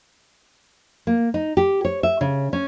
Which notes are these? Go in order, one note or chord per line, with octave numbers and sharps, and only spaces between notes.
A#3
D#4
G4
C#5
E5
C#3
C#4